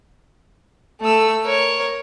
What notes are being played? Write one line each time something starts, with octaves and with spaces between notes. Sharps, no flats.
A3 E6
A#4 C#5